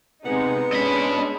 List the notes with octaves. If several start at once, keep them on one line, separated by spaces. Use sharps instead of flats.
C3 G#3 B3 D#4 F#5
G#3 C#4 D4 D#5 B5